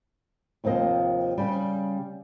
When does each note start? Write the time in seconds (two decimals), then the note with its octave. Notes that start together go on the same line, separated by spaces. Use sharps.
0.64 D#2 C3 F3 A#3 D#5
1.38 C#3 G3